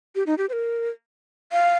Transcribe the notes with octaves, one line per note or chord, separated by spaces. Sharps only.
G4
D#4
G4
C5
A#4
F5